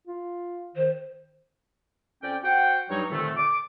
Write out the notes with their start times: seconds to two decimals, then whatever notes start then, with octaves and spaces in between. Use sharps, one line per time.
0.07 F4
0.76 D#3 C5
2.23 F2 C#4 D5 G5
2.43 F#4 C5 F#5 G5
2.90 G2 F#3 G3 D#4 C#5
3.11 F2 A#2 D3 D#3 A3
3.37 D6